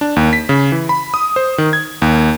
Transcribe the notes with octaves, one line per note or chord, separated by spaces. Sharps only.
D4
D#2
B6
C#3
E3
B5
D#6
C5
D#3
G#6
D#2